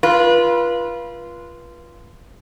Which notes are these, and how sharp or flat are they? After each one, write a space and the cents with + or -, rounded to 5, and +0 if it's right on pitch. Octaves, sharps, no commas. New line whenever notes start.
F4 -15 B4 -30